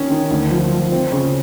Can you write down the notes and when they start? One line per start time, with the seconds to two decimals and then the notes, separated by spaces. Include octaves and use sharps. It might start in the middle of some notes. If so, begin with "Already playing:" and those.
Already playing: D#3 C#4
0.10 D#3
0.31 D2
0.51 F3
0.71 F3
0.92 C4
1.12 C#3